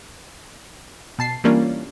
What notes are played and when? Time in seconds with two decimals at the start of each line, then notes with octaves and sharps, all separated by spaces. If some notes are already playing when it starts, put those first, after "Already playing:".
1.18 B2 A5 C7
1.44 E3 G3 A#3 C#4 D4 F4